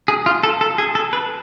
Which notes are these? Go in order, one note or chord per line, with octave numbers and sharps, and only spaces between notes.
G#4
F4
A4
A4
G#4
A4
B4